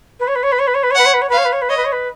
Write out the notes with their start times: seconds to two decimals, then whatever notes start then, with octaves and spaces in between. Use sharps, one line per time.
0.19 B4
0.27 C#5
0.35 B4
0.43 C#5
0.52 B4
0.59 C#5
0.67 B4
0.74 C#5
0.83 B4
0.90 C#5
0.95 B4 F#5
1.05 C#5
1.13 B4
1.21 C#5
1.29 B4
1.32 F5
1.37 C#5
1.44 B4
1.52 C#5
1.61 B4
1.69 C#5 D#5
1.77 B4
1.84 C#5
1.92 B4